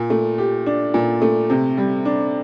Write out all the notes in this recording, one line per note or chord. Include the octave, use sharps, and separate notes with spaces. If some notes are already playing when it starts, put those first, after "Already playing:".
Already playing: A#2
A3
G4
D4
A#2
A3
C3
G3
D4